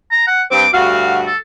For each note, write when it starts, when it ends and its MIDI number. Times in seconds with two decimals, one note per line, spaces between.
0.12 0.26 82
0.27 0.42 78
0.51 0.66 43
0.51 0.66 60
0.51 0.69 86
0.73 1.28 38
0.73 1.28 43
0.73 1.28 66
0.73 1.17 77
1.26 1.37 69